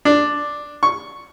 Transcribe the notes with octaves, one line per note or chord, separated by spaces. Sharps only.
D4
C#6